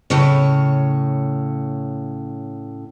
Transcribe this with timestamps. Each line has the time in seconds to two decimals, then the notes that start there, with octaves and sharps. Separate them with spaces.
0.10 A2 C#3 C#5